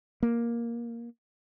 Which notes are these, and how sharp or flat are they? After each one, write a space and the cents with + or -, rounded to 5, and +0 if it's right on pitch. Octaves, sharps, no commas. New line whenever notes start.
A#3 +10